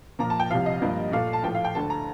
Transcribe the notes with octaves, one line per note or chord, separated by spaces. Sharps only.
A#2 F3 A#3 A#5
A5
G5
C2 C3 F3 F5
D#5
G2 F3 A#3
A#2 A3 F5
A5
A2 F3 A3 G5
F5
G5
D2 D3 A3 A5
A#5